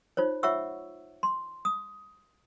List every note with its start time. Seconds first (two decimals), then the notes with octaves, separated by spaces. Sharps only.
0.17 D#4 F4 C5 C#5
0.43 F4 C#5 E5 F#5 C#6 E6
1.23 C6
1.65 D#6